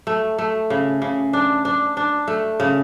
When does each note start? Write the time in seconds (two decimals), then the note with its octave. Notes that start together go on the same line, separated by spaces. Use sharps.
0.07 A3
0.39 A3
0.70 C#3
1.02 C#3
1.33 D4
1.65 D4
1.97 D4
2.27 A3
2.60 C#3